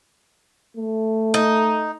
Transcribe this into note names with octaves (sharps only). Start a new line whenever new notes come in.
A3
D#4